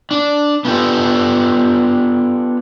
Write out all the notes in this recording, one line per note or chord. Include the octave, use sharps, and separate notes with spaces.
D4
B3 D4 F4 G4 A4